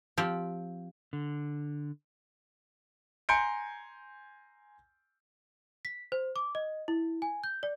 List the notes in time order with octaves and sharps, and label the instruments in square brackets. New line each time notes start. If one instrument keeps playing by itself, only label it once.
[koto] F3 C4 G4
[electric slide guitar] D3
[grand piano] G#5 A#5 C6 G6 C#7 D7
[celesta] B6
C5
D6
D#5
E4
G#5
G6
D5